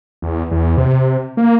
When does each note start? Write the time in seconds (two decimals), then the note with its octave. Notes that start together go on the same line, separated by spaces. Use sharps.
0.22 E2
0.51 E2
0.77 C3
1.37 A#3